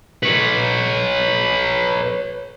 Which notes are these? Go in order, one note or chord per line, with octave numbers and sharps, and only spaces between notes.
B4 C#5